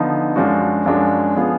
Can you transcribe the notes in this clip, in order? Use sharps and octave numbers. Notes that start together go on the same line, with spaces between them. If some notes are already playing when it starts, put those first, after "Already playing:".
Already playing: D3 F3 B3 D#4
F#2 F3 G#3 D4 F#4
F#2 F3 G#3 D4 F#4
F3 B3 F4 G#4